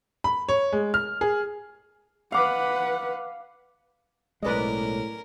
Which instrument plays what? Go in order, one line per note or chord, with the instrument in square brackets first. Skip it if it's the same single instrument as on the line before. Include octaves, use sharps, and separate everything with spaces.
[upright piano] B5
C#5
G#3
F6
G#4
[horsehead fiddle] B4 F#5 [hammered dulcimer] F5 D6
[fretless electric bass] B1 G#3 [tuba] A2 [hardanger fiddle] C#4 A#4 [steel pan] B4 D5 D#5